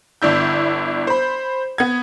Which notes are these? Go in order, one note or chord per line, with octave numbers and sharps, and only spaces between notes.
G1 D4 E4 G6
C5 B5
B3 G#6